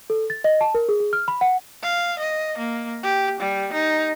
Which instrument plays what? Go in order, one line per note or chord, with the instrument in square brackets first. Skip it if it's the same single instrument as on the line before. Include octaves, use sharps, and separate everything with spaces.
[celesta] A4
A6
D#5
A5
A#4
G#4
G#4
F6
B5
F#5
[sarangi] F5
D#5
A#3
G4
G3
D#4